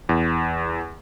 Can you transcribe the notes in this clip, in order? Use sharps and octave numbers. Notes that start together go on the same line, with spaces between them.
E2